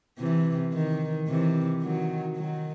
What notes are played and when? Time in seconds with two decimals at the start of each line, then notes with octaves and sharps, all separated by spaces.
0.19 C3 E3
0.74 D#3
1.28 C3 E3
1.82 D#3 F#3
2.37 D#3 F#3